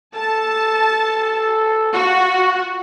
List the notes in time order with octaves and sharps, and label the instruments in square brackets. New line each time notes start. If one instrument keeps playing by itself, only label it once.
[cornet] A4 [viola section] A5
[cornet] F4 [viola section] F#4